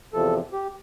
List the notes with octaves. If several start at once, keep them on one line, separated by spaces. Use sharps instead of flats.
E2 C3 F3 A4
G4